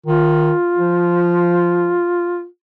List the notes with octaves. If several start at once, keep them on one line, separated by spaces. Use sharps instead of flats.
D#3 F4
F3